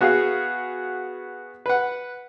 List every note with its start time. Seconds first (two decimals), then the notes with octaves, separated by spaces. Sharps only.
0.01 B3 F#4 G#4 F5
1.66 B4 F#5